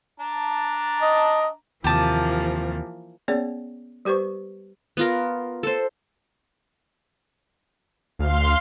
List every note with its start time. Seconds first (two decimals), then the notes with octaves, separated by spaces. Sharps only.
0.20 D4 A5 A#5
1.02 D#5
1.84 D#2 C3 E3 F3 A#3 G4 A5 D#6
3.28 A#3 B3 C#4 G#4 C#5 D5
4.05 G3 G4 B4 C5 C#6
4.97 B3 F4 A#4
5.63 A4 C5
8.19 D2 F5 C6